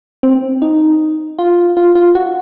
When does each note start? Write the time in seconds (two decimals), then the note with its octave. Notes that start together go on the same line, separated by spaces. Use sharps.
0.23 C4
0.62 D#4
1.39 F4
1.77 F4
1.95 F4
2.15 F#4